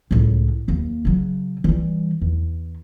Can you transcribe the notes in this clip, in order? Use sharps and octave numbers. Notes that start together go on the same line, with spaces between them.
C#2 A2
D#2 A#3
C#3 F#3
E3 G3
E2